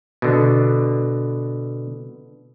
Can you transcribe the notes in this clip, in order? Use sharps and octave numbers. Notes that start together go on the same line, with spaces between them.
B2 D3